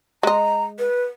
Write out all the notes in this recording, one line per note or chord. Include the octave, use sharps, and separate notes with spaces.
G#3 D#5 A#5
B4